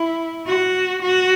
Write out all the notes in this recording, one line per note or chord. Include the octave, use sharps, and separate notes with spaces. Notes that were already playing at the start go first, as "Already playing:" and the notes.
Already playing: E4
F#4
F#4